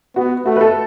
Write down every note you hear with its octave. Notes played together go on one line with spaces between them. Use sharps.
B3 F#4
A3 F#4
B4
A4